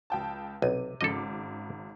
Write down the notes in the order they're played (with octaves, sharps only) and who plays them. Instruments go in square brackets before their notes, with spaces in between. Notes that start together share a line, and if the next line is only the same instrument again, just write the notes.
[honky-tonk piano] C#2 G5 A5
[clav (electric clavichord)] B1 [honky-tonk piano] C3 D#7
[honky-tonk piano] G#1 C#3 D6 [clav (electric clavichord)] A4 D#5